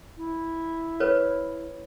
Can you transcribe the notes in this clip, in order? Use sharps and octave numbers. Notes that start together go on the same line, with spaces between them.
E4
B4 C#5